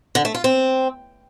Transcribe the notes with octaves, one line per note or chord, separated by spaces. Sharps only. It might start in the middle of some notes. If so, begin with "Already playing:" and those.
D3
A3
F4
C4